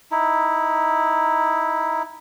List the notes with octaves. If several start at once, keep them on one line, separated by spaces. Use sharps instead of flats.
D#4 E4